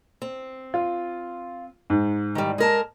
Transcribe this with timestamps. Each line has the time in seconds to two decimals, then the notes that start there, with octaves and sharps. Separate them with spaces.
0.22 C4
0.74 F4
1.90 G#2
2.35 D#3 G3
2.58 G#3 A#4 A5